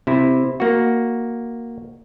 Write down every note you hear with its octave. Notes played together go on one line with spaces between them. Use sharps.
C3 E4
A#3 F#4